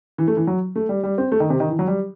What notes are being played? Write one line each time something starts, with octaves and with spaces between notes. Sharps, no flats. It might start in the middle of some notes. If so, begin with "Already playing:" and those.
E3
A3
E3
F#3
A3
G3
G3
C4
A3
D#3
C3
D#3
E3
F#3
G3